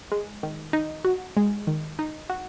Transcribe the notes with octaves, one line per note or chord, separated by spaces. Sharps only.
G#3
D#3
D#4
F#4
G#3
D#3
D#4
F#4